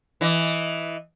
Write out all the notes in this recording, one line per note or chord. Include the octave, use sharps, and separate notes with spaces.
E3 D#5